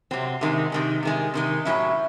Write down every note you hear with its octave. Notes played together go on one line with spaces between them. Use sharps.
C3 F#3 C4
C3 D#3 G#3
C3 D#3 G#3
C3 D#3 G#3
C3 D#3 G#3
A2 F#3 C#4 E4